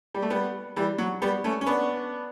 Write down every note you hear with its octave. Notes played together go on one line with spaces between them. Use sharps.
G3
A3
G3 B3
E3 G3
F#3
G3 B3
A3 C#4
C#4
B3 D4